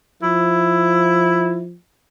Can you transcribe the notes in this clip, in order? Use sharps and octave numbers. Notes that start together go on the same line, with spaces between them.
F3 E4